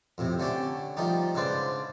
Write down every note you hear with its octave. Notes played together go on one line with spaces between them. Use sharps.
F2 A2 C3
D3 A3 C#4 D4 G4
F3 G3 A3 D#4 G4
G#2 C#3 D4 B4 C5 D5